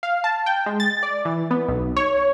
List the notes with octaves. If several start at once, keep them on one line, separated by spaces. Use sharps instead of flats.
F5
A5
G5
G#3
A6
D5
E3
B3
B1
C#5